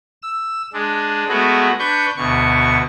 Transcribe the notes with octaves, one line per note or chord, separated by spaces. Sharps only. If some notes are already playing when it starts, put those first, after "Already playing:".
E6
G#3 D4
G#3 A3 B3 F#4
D4 B4 C#6 G6
D2 B2 C#6